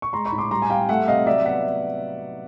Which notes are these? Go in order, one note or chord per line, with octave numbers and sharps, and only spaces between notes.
C#6
G#3 A#5 C6
B5 C#6
A2
C6 D6
G3 A#5 C6
G#5
G3 F5 G5
A3 E5 F#5
C3 D#5 F5
F#3 D5 E5
B3 E5 F#5